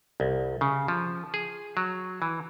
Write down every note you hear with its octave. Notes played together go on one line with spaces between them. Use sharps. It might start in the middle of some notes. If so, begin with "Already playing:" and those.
C2
C#3
F3
G#4
F#3
E3